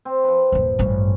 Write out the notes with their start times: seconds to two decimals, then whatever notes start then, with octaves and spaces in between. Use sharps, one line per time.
0.05 C4
0.24 F3 B4
0.52 D#1 G2
0.79 A1 G2 C#4